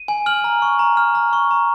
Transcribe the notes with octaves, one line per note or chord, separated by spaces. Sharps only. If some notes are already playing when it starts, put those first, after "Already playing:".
Already playing: D#7
G#5
F6 F#7
A#5
C#6
A#5
F6
A#5
C#6
A#5